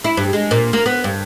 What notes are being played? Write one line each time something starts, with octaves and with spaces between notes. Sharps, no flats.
E4
G2
G#3
A#2
A#3
B3
G2